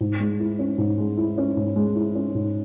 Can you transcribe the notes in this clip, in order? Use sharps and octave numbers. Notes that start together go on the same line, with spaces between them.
G#2
G#3
E4
C#4
G#2
G#3
E4
C#4
G#2
G#3
E4
C#4
G#2